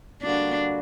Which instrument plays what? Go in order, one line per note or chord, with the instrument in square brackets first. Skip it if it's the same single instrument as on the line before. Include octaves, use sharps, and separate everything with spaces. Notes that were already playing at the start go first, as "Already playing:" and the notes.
[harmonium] D3 G3 A#3 F#4 [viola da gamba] D4